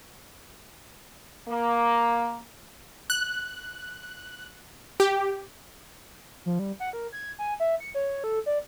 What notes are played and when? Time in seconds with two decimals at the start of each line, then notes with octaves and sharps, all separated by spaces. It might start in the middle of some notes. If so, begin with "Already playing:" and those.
1.48 A#3
3.10 F#6
5.00 G4
6.46 F3
6.59 G3
6.80 F#5
6.93 A#4
7.12 G#6
7.39 G#5
7.60 E5
7.80 C#7
7.95 C#5
8.24 A4
8.46 D5